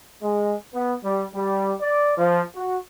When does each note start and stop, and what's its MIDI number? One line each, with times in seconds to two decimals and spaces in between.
0.22 0.54 56
0.74 0.95 59
1.04 1.25 55
1.35 1.73 55
1.81 2.13 74
2.17 2.41 53
2.56 2.77 66